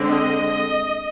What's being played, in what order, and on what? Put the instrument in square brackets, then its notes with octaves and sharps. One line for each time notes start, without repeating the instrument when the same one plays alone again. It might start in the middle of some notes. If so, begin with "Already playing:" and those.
Already playing: [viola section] D3 G#3 C4
D#5